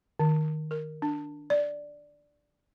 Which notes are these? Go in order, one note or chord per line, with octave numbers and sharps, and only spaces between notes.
D#3
A#4
D4
D5